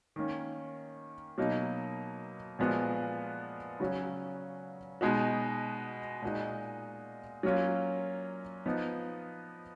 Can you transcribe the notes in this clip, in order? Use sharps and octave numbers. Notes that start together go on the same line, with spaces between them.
D#3 A#3 C#4
B2 F#3 A#3 D#4
A#2 F3 G#3 B3 F#4
C#3 F#3 C#4 F#4
B2 G#3 D#4 F#4
A#2 G#3 D#4 F#4
F#3 A#3 C#4 F4
F3 B3 D#4